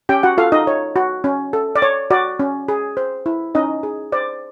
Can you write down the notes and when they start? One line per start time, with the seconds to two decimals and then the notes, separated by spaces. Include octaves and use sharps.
0.09 C#4 G4 G5
0.23 F#4 F#5
0.38 F4 A4 F5
0.52 D#4 D#5
0.67 C#5
0.96 F#4
1.24 C#4
1.53 A4
1.76 D5
1.82 C#5
2.11 F#4 D5
2.40 C#4
2.68 G#4
2.97 C5
3.26 E4
3.55 C#4 D#4 D#5
3.83 G#4
4.12 C5 D5